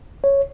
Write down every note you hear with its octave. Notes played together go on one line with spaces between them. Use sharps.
C#5